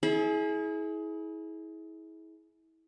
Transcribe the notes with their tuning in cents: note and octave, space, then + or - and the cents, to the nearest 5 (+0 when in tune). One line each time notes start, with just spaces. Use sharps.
E4 -30 G#4 +25